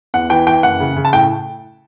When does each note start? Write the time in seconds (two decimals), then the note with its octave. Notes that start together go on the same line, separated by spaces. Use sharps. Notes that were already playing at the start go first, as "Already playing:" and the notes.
0.14 E2 F#5
0.30 E3 G5
0.47 E3 G5
0.63 F#1 F#5
0.80 C#3
0.96 C#3
1.05 A5
1.13 A2 G5